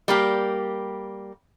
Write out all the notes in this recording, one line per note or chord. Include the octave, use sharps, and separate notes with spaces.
G3 A#3 G4